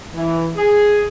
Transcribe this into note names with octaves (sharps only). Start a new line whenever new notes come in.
E3
G#4